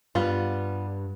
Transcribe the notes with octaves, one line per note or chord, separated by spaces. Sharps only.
G2 G3 B3 F4